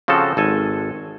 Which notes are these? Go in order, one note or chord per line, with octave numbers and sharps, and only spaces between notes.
C#3 F3 C4 F#4 A4
G#1 A4 G#5